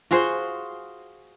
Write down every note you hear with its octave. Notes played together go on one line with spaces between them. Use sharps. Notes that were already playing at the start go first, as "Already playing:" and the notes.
F4 F#4 G#4 C5